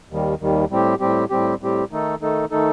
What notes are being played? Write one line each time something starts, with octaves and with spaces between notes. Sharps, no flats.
D#2 D#3 G3
D#2 D#3 G3
A2 G3 C4 G4
A2 G3 C4 G4
A2 G3 C4 G4
A2 G3 C4 G4
D#3 A3 D#4 A4
D#3 A3 D#4 A4
D#3 A3 D#4 A4